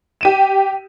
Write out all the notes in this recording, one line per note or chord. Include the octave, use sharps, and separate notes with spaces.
G4 D#7 E7